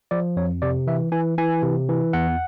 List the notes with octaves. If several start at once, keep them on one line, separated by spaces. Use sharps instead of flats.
F3 D5
F2 C#5
C3 D5
E3 E5
E3 G#5
E3 G#5
C3
E3
E2 F#5